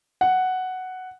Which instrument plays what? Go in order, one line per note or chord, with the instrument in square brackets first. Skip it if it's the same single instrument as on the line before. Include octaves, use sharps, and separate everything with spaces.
[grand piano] F#5